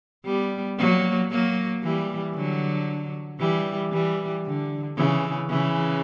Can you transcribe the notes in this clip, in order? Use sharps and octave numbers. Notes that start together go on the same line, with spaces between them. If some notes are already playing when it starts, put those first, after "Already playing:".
G3 B3
F#3 A#3
F#3 A#3
E3 G3
D3 F#3
E3 G3
E3 G3
D3
C#3 E3
C#3 E3